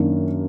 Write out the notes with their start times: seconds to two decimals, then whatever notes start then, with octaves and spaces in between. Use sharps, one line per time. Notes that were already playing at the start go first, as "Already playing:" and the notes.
Already playing: F#2 D#3 A#3 D4